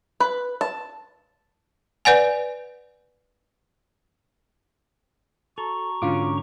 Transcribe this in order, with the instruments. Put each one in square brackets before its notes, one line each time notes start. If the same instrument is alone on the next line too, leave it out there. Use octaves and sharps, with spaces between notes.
[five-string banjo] B4
A5
[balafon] B4 D5 F#5 G#5
[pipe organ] F#4 A#5 C#6 [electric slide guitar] A4
[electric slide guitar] G#2 D3 C#4 [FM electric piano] F4 D6